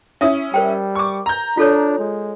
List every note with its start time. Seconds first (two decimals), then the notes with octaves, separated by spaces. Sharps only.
0.21 C#4 E4 E5 D#6
0.54 G3 A#4 C5 G5
0.95 C#6 D6
1.26 A#5 G6
1.57 D4 F4 A4 C#5
1.99 G#3